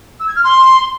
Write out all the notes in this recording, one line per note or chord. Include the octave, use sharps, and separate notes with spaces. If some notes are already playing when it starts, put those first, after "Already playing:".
E6
G#6
F6
C6